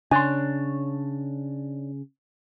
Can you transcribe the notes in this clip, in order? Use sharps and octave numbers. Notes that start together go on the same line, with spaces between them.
C#3 D4 C#5 G#5 C6